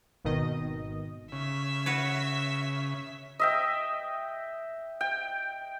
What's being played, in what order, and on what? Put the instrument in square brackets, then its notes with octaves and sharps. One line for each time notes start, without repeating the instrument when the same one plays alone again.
[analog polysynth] G#1 B2 D#3 D#5
[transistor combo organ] C#3 [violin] E5
[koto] F#4 B4 C#5
[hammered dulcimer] D#5 E5 G5
G5